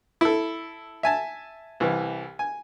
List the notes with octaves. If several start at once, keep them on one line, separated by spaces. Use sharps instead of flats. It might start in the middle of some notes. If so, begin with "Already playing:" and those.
E4 A4
E5 G#5 A5
C2 E3
G#5